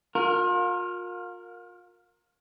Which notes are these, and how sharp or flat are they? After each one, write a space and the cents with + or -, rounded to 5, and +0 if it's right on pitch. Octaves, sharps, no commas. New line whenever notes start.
F4 +35 A#4 -10